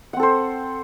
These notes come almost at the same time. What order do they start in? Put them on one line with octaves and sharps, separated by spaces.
F#5 C4 A4 C5